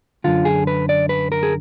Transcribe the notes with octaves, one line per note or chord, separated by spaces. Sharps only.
F#2 D3 F4
G#4
B4
D5
B4
A#4
G#4